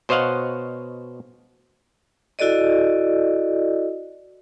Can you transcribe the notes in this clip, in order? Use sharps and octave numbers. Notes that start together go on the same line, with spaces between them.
B2 C5 C#5 D#5 F5 F#5
E4 F#4 A4 D5 D#5